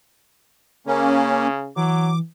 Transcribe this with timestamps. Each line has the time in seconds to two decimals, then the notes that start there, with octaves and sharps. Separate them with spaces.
0.87 C#3 A#3 C#4
1.76 E3 F#3 D6